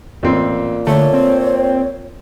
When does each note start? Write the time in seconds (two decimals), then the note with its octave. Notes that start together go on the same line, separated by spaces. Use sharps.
0.23 A1 A#2 C4
0.87 D3 A3 C#5
1.13 C4